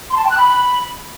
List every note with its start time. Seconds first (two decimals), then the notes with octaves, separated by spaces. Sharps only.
0.10 C6
0.17 A5
0.24 G5
0.30 F#6
0.37 B5